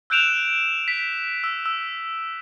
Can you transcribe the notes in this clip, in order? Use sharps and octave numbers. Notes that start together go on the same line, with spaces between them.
E6 F#6 G6 D7 E7 F7
B6
E6
E6